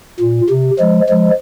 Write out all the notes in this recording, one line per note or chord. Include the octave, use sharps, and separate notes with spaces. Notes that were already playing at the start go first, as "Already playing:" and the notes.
A#2
C3
F3 G#3
F3 G#3